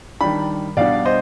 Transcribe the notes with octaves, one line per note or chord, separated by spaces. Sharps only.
D#3 G3 D4 G5 B5
B2 G3 D4 D5 F5
C5 D#5